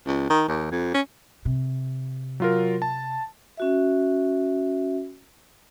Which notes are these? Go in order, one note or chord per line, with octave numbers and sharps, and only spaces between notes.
C#2
D#3
D#2
F2
C#4
C3
F#3 F4 A#4
A5
C#4 F#4 E5